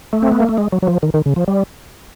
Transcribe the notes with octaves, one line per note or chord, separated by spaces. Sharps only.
A3
C4
B3
A#3
A3
G#3
F#3
F#3
F3
D#3
D#3
C#3
F3
G3